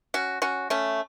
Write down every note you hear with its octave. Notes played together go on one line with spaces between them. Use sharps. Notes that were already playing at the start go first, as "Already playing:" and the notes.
C#4 F#4
C#4 F#4
A3 C#4